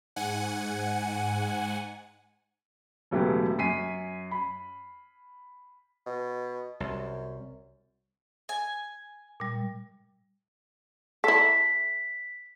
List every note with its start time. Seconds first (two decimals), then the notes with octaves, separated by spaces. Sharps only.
0.16 G#2 F#5 G#5
3.11 E1 C#3 F#3 A3 B3 G4
3.58 F#2 G#5 B6 C7 D#7
4.31 B5
6.06 B2
6.80 C2 F#2
8.49 G#5
9.40 A#2 G3
11.24 E4 A4 B6